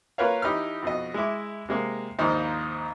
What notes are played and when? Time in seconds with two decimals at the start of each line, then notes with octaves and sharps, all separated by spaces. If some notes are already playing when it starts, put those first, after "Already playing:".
0.18 A#3 F4 A#4 B4 C#5 F5
0.42 E3 D#4 G4 B5 F6
0.83 F2 B2 D#5
1.14 G#3 E4 E5 D6
1.69 C3 G#3 A#3
2.19 A#1 D#2 G#2 D#4 C5